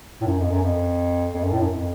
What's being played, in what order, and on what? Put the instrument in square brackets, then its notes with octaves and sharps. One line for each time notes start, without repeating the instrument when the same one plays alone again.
[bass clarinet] A2
F#2
F2
F#2
F2
F2
F#2
A2
F#2
F2